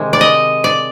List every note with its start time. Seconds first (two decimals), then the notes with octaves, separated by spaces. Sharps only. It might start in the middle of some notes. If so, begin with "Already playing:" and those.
Already playing: C3 D#3 G#3
0.13 D5
0.21 D#5
0.64 D5